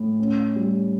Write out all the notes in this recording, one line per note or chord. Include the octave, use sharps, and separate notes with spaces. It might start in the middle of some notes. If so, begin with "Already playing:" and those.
Already playing: A2
C#4
G3